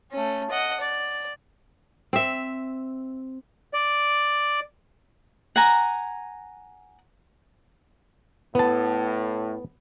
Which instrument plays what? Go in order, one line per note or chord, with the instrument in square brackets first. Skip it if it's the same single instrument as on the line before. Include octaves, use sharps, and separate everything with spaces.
[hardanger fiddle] A3 C#4
D#5 F#5
D5
[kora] C4 E5
[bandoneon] D5
[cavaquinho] F#5 G#5 A#5
[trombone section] A2 [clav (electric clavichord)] B3 A5